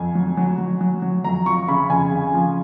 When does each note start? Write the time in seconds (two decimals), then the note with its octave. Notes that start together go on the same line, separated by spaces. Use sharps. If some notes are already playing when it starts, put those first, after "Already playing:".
Already playing: F2 G#5
0.15 F#3
0.37 F#3
0.58 F#3
0.81 F#3
1.02 F#3
1.24 F2 A#5
1.46 F3 C#6
1.68 C#3 B5
1.90 F2 G#5
2.12 C#3
2.33 F3